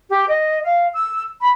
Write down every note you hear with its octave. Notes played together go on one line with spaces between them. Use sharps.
G4
D#5
F5
E6
B5